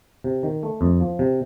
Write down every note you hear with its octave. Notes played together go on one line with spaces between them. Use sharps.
C3
D#3
A3
F2
F3
C3